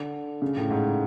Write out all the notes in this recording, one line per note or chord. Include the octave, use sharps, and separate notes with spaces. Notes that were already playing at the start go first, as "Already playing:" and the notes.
Already playing: D3
C#3
A2
G#2